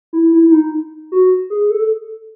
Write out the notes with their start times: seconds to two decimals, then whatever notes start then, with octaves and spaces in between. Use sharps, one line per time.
0.13 E4
0.33 E4
0.47 E4
0.52 D#4
1.12 F#4
1.50 G#4
1.70 A4